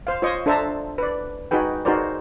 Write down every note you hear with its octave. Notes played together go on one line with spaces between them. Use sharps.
C5 F5
F4 C5 C#5 D#5 C#6
D4 A4 C5 E5 A5 A#5
B4 D5
D#4 F#4 G#4 B4 G5
D#4 F#4 G#4 A#4 C5 D5